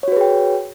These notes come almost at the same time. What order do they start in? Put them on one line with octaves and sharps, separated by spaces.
C#5 F#4 B4 G#4 G5